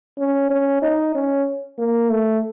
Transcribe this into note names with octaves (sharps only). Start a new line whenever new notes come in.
C#4
C#4
D#4
C#4
A#3
A3